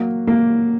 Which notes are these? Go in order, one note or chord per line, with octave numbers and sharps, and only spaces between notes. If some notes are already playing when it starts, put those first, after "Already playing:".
Already playing: F#3 A#3
A#3